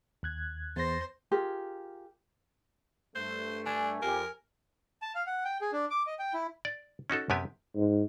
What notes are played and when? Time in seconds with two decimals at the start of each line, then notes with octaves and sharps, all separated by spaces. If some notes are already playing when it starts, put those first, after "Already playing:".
0.23 D#2 F#6 G#6
0.76 E2 C5 A6 A#6
1.31 F4 G4 G#4 A#4
3.15 G2 A3 C5
3.66 D4 G#5
4.02 F2 G4 A#4
5.02 A5
5.15 F5
5.27 F#5
5.45 G5
5.61 G#4
5.72 D4
5.91 D6
6.07 D#5
6.19 G5
6.34 E4
6.65 D5
7.10 C#4 D#4 F#4 A4
7.30 F#2 C3 B3 G4 G#5
7.76 G#2